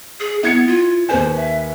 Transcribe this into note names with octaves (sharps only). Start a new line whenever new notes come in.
G#4
B3 E4 G#6 C#7
F4
D#2 B4 C5 G#5
E5